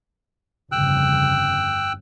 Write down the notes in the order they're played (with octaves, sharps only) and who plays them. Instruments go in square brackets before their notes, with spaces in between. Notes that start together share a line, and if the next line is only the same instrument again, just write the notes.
[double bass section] G1 F2 C#3 [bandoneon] G5 E6 F#6